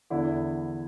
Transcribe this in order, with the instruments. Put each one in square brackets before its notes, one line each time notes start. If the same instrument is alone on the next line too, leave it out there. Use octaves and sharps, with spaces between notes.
[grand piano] E2 D3 E4